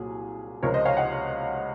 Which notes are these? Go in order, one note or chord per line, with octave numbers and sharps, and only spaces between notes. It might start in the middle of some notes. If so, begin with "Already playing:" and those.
Already playing: C2 A#2 F#3 G#4
C#2 C3 F3 A#4 C#5
C5 D#5
C#5 F5
D#5 F#5